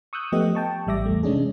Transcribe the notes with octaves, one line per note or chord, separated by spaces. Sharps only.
C#6 D#6 E6 F#6 G6
F3 A3 B3 G4 D#5
G5 A5 C#6
A1 G3 E5 D6 A#6
E2 A3
C3 G#3 C#4 D4 G#4